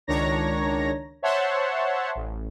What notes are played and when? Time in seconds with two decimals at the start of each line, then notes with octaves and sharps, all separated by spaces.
0.07 C#2 D#3 D4 C#5 A#5 A#6
1.22 C5 C#5 E5 F#5 A5 C6
2.15 A1